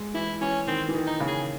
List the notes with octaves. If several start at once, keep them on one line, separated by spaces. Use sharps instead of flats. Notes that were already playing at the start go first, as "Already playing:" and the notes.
Already playing: G#3
E3 E4
E3 C#4
D#3 C4
E3
D#3
D#4
C#3
G#4